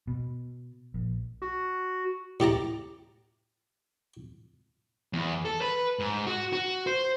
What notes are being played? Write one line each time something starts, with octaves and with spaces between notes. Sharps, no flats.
B2
A#1
F#4
A2 G4 A5 A#5
E2
A4
B4
G#2
F#4
F#4
C5